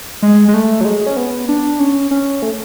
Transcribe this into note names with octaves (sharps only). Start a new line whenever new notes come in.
G#3
G#3
A3
F#3
G#3
C#4
B3
D4
C#4
C#4
A3